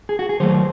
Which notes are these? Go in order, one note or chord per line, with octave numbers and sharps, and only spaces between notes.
G#4
F#4
G#4
D#3 F#3 A3 C5